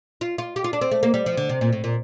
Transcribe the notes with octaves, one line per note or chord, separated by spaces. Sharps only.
F4
F4
G4
F4
D4
C4
A3
A#3
G3
F3
D3
C3
A#2
A2
A#2